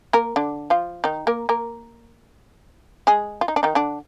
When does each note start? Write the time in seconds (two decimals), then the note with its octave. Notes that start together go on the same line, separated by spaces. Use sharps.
0.13 A#3 A#4
0.36 D3 D4
0.70 F3 F4
1.04 D#3 D#4
1.27 A#3 A#4
1.49 A#3 A#4
3.07 G#3 G#4
3.41 F4
3.48 D#4
3.56 D4
3.63 D#3 D#4
3.75 D3 D4